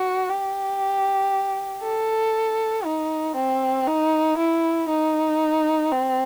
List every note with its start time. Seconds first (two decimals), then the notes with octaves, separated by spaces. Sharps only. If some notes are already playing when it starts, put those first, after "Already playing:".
Already playing: F#4
0.29 G4
1.82 A4
2.85 D#4
3.36 C4
3.87 D#4
4.38 E4
4.89 D#4
5.92 C4